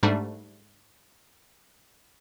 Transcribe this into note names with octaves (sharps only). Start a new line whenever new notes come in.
G#2 G3 A3 D4